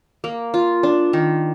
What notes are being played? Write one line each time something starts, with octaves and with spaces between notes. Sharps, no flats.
A#3
F4
D4
D#3